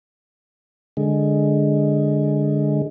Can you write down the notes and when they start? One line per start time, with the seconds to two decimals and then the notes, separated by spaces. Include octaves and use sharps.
0.97 D3 G#3